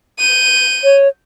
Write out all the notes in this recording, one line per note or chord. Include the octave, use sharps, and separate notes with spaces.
G6 D#7
C#5